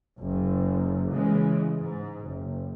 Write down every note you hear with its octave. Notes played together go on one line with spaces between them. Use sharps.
F#1
C#3 E3 G#3
G#2
F#1